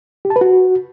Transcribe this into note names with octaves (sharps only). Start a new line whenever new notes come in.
G4
A5
B4
F#4